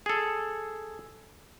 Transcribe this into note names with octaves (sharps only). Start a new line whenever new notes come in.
G#4 A4